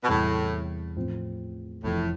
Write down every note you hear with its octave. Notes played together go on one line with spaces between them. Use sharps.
B2
E2 A2 C3 G3
A2 F3 C4 F4
F1 F2 A2 E3